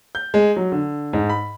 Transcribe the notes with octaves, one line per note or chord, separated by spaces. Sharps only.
G6
G#3
F#3
D3
G#2
B5